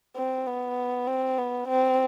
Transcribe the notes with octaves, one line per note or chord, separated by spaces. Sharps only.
C4
B3
C4
B3
C4